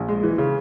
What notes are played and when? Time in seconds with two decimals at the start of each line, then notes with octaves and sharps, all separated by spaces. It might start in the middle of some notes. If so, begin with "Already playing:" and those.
Already playing: A#1
0.08 G#3
0.23 E3
0.38 C#3